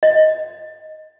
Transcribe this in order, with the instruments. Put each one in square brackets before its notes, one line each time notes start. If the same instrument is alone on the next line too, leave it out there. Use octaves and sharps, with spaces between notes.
[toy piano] D#5